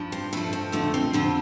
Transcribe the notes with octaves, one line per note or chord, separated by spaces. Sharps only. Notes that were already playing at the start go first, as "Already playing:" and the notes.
Already playing: G2 F3
C4
G2 F3 A3
C4
F2 D3 F3 A3
C4
F2 D3 F3 C4